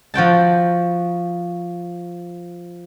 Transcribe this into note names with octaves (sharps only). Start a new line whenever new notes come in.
F3 F#4 G5 A5